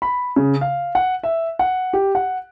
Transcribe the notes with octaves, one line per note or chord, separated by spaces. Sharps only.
B5
C#3
F5
F#5
E5
F#5
G4
F#5